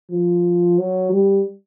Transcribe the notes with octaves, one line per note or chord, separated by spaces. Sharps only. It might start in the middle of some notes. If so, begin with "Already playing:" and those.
F3
F#3
G3